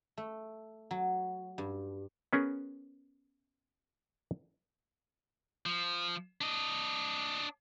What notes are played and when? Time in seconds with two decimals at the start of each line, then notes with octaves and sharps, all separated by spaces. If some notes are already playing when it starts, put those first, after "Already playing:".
0.17 A3
0.91 F#3
1.58 G2
2.33 B3 C#4 G#4 A#4
5.66 F3
6.41 D4 D#5